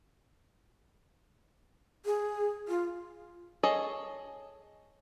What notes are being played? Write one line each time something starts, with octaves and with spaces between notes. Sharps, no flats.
G#4
F4
G#4 A4 C#5 D#5